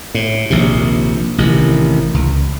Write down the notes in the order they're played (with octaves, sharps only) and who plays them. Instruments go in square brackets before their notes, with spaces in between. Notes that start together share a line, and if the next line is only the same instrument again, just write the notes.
[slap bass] A2
A#1 D#2 C3
A1 C3 D#3
C#2